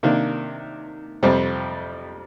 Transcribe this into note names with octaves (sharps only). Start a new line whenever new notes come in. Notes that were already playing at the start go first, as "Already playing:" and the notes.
C3 D#3 A#3 D4
F2 C3 G3 C4